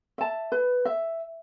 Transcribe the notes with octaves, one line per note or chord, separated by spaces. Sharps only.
E5 A5
B4
E5